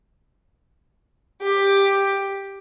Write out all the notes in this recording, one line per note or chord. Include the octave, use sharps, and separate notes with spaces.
G4